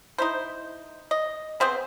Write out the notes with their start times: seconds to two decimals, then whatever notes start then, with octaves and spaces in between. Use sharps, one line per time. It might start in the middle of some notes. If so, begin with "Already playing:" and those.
0.18 D#4 E4 C5
1.11 D#5
1.60 B3 C4 G#4 C5